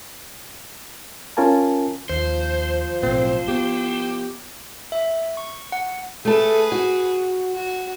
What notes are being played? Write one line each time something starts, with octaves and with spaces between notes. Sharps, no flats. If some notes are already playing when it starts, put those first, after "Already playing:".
C#4 F4 A#4 G#5 A5
D#2 F3 F4 C5
B1 A2 C4
B3 G4
E5
C#6
F#5
A3 G#4 A4 B4
F#4
F#4